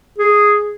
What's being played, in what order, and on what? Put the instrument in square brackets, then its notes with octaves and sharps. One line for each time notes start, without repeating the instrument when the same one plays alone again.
[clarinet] G#4